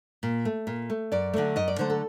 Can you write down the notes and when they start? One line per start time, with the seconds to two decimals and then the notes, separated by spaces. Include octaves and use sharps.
0.23 A#2
0.45 A3
0.67 A#2
0.90 A3
1.12 F#2 D5
1.34 D3 F#3 A3
1.56 F#2 D#5
1.68 D5
1.79 D3 F#3 A3 C5
1.90 A4